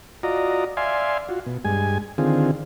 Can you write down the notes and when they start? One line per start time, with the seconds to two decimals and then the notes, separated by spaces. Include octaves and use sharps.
0.23 F4 F#4 D5 D#5 A#5
0.77 D5 E5 F5 G#5 C6
1.29 F4 F#4
1.46 B2
1.65 G2 G#3 G#5
2.18 D3 D#3 C4 F4 G#4